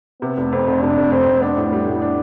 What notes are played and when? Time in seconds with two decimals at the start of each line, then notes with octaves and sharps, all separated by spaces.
0.22 C3 B3
0.37 F1
0.52 F2 C4
0.67 F1
0.82 C3 D4
0.97 F1
1.12 F2 C4
1.27 F1
1.42 B3 D4
1.57 A2
1.72 G3
1.87 A2
2.02 D4